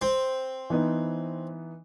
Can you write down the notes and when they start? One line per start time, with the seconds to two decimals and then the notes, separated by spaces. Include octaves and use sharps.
0.02 C4
0.70 E3 B3 D#4